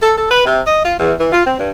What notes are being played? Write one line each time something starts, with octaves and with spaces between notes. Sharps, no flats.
A4
A4
B4
C3
D#5
F4
E2
E3
F4
C4
G2